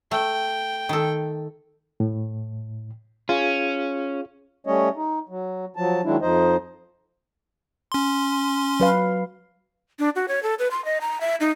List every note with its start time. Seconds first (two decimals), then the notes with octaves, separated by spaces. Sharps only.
0.11 A3 G5
0.89 D#3 A4
2.00 A2
3.29 C#4 F4 G#4 F5
4.67 G3 A3 C#4 C#5 D#5
4.96 D#4
5.29 F#3
5.76 F3 F#3 A5
6.05 D#3 F#3 G#3 D4 E4
6.22 F2 F3 D#4 C5 D#5
7.92 C#4 C6
8.80 F#3 B4 F5
9.99 D4
10.16 F#4
10.28 C#5
10.43 A4
10.59 B4
10.71 C6
10.85 D#5
11.01 A#5
11.21 E5
11.40 D#4